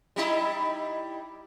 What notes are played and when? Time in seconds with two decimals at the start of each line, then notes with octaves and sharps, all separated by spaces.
0.16 G3 D#4 E4